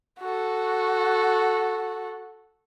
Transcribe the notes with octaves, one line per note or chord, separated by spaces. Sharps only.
F#4 A4